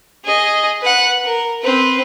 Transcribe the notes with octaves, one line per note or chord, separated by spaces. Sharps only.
G#4 D#5
B4 F#5
A#4
C4 B4